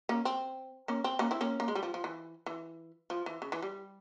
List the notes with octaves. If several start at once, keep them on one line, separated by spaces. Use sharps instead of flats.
A#3 C#4
C4
A#3 C#4
C4
A#3 C#4
C4 E4
A#3 C#4
A#3
G#3
G3
F3
F3
E3
E3
F3
E3
C#3
E3
G3